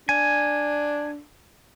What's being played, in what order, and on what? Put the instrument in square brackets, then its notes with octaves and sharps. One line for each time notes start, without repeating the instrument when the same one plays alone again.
[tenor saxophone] D4 [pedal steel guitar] G#5